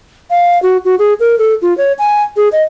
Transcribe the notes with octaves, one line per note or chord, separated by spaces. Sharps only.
F5
F#4
F#4
G#4
A#4
A4
F4
C#5
G#5
G#4
D#5